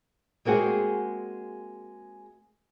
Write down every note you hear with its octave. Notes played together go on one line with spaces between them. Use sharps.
G#3 A#3 C4 F#4 G#4